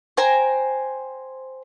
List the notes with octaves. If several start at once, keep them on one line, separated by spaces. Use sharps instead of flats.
C5 G5 G#5 A#5